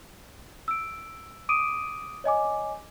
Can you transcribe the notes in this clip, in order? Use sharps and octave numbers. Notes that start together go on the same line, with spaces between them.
E6 D7
D6 D#6 D7 D#7
C#5 D#5 G#5 D6